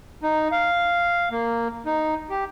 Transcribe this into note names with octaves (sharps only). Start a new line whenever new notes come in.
D#4
F5
A#3
D#4
G4